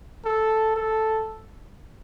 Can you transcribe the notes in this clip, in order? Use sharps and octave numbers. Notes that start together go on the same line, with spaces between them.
A4
A4